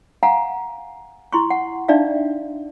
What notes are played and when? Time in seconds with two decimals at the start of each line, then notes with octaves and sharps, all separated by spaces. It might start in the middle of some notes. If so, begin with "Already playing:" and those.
0.23 F5 F#5 G#5 A#5
1.33 E4 C6 C#6
1.50 F#5
1.88 D4 D#4 D5 E5 F5